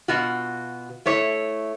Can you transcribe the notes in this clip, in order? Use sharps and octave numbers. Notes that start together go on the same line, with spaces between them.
B2 F4 F#4
A3 E4 C#5